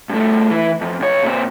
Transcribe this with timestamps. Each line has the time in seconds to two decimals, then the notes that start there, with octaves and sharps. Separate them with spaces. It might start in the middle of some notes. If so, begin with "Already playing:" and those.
0.09 G2 A3
0.50 E3 E4
0.81 F2
1.00 B1 C#5
1.23 A#2 C4